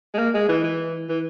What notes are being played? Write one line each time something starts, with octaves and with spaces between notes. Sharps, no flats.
G#3
A#3
G#3
E3
E3
E3